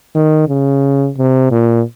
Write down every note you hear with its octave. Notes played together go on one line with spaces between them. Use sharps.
D#3
C#3
C3
A#2